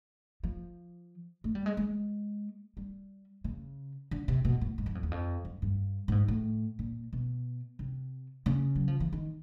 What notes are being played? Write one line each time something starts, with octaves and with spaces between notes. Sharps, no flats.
F3
A3
G3
G#3
G#3
G3
C#3
D3
C3
B2
A2
G#2
F#2
F2
E2
F2
F#2
G2
A2
G#2
A2
A#2
B2
C3
C#3
F#3
F3
E3
D#3